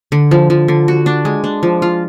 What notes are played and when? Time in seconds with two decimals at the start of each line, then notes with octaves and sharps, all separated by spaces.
0.12 D3
0.31 F3
0.50 F3
0.68 D3
0.88 F#4
1.06 D4
1.25 G#3
1.44 D4
1.63 F3
1.82 F4